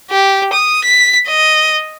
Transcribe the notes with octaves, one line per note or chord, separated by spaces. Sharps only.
G4
D#6
B6
D#5